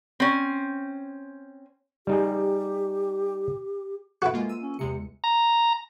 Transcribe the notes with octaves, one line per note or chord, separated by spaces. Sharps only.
C4 C#4
G3 D#4 G4 G#4
E4 F#4 A4 B4
G#3 A#3 F4
E6 D#7
C#4
E2 C3 G#3 C#7
A#5